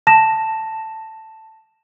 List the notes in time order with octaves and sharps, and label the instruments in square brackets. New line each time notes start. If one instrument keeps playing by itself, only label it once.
[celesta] A5 A#6 E7